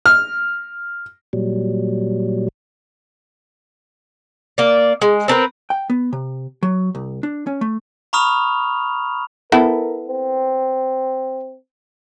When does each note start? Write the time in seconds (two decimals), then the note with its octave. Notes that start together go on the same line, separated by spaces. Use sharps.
0.06 F6
1.33 A#2 F#3 G3
4.58 A#3 D5
5.02 G#3
5.28 C4 D4 A#4 B4
5.70 G5
5.90 B3
6.13 C3
6.63 F#3
6.95 C2
7.23 D4
7.47 C#4
7.61 A3
8.13 A#5 B5 C#6 D#6 F6 F7
9.52 B3 E4 A4 A#4
10.08 C4